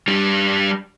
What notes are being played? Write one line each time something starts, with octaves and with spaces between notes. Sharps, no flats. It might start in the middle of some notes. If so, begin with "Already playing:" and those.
G3 D4